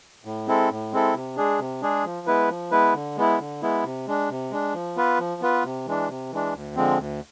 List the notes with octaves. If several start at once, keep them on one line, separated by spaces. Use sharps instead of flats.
A2
G#3 C4 E4 A4
A2
G#3 C4 E4 A4
C3
G#3 D4 G#4
C3
G#3 D4 G#4
F3
G#3 B3 E4 B4
F3
G#3 B3 E4 B4
D3
G#3 B3 E4
D3
G#3 B3 E4
C3
G#3 D4
C3
G#3 D4
F3
B3 F4 B4
F3
B3 F4 B4
C3
E3 G#3 D4
C3
E3 G#3 D4
D2
D3 F3 G#3 C4
D2